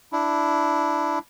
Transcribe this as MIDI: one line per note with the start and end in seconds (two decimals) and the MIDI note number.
0.12 1.19 62
0.12 1.19 64